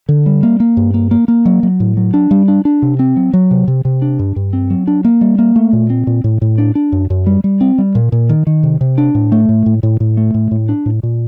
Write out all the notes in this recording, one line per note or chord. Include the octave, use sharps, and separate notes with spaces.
D3
G3
A#3
A#3
G2
A#3
A#3
A#3
F#3
F#3
A2
F#3
D4
G3
D4
D4
C3
C4
F#3
F#3
C3
C3
C3
D4
G2
G2
C4
F#3
D4
A#3
G3
A#3
A3
A#2
C4
A#2
A2
A2
D4
D4
F#2
F#2
G3
G3
C4
G3
A#2
A#2
D#3
D#3
C3
C3
D4
A2
A3
A2
A2
A2
A2
A3
A2
A2
D4
A2
A#2